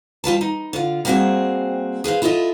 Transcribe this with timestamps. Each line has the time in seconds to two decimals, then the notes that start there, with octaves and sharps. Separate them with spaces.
0.24 G3 F4 B4 A5
0.41 D#4
0.73 D3 F4
1.05 G3 A#3 C4 F#4 G#4 C5
2.04 G#4 B4 C5 F5
2.22 E4 F4 A4 C5 D#5